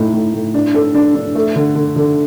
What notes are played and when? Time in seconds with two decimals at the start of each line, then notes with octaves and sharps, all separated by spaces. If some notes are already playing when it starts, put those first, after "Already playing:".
Already playing: A2 D#4
0.13 A2
0.34 A2
0.54 D4
0.74 A4
0.94 D4
1.15 D4
1.35 A3
1.56 D3
1.75 D3
1.96 D3